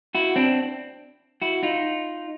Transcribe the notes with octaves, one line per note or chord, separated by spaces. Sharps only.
E4 F#4
C4 D4
E4 F#4
D#4 F4